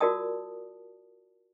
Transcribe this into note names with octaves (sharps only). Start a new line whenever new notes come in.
F4 F#4 A#4 D5 A5 D#6